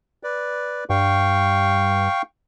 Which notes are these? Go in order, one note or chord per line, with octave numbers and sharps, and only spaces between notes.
B4 D5
G2 F5 G5 C#6